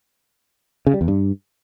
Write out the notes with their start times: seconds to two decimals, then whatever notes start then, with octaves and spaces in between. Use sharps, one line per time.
0.87 C#3
0.94 G3
1.01 E2
1.08 G2